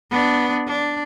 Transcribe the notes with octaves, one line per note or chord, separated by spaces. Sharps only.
B3 D4
D4